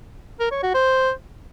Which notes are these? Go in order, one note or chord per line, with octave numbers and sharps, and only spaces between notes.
A#4
C#5
F#4
C5